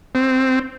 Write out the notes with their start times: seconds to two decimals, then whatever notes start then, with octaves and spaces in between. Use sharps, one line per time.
0.15 C4